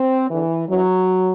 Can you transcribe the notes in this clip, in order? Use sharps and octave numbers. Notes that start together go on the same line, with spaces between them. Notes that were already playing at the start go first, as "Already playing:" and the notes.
Already playing: C4
E2 D3 E3
F#2 E3 F#3